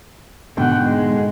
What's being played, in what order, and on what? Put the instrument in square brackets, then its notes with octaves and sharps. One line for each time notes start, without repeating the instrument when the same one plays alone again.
[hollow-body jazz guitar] G#2 B2 D3 [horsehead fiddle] F#5 G5
[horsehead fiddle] G#3